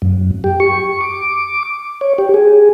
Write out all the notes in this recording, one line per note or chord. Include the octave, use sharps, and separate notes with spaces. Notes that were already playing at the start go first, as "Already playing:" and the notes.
F#2
G4
C#6
D6
C#5
G4
G#4